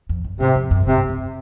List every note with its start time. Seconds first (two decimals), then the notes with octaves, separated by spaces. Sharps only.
0.09 F2
0.24 F#2
0.40 G#2 C3
0.56 F2
0.71 F#2
0.86 G#2 C3
1.09 C3